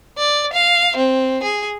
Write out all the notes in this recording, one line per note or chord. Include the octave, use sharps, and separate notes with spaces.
D5
F5
C4
G#4